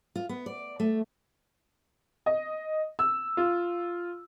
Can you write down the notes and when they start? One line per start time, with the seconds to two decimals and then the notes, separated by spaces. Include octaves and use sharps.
0.15 F4
0.29 B3
0.46 D5
0.80 A3
2.26 D#5
2.99 E6
3.37 F4